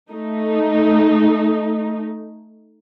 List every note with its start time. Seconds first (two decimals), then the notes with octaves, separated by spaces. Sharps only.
0.11 A3 D#4